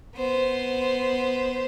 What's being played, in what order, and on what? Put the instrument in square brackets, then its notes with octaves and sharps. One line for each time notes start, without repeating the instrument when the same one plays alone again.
[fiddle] B3 C5